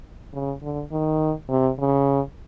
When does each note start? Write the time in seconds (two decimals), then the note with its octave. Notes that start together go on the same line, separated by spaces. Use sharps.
0.33 C#3
0.62 D3
0.91 D#3
1.49 C3
1.79 C#3